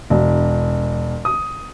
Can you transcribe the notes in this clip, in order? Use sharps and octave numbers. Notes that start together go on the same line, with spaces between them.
E1
D#6